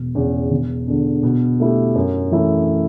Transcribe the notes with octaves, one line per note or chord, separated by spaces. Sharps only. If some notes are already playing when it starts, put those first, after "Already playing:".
Already playing: E1
E2 C#3
E1
E2 D3
B2
A3 E4 G4
F#2
E3 A3 E4